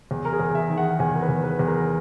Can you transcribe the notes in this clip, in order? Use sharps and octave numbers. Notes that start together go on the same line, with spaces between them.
E2
A#4
G#4
E2
E5
D#3
F#5
E2 G#5
A#4
B4
E2
B4
E2
A#4